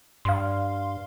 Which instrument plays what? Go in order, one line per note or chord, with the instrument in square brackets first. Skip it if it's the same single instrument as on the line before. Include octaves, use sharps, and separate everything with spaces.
[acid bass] G2 [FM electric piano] F5 C6